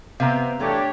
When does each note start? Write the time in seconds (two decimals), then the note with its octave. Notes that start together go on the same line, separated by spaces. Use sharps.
0.20 C3 B3 C4 F5 A#5
0.60 E3 A3 D4 G4 C#5